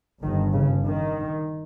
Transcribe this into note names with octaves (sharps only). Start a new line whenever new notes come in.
G1 G2 D#3
C#3
D#3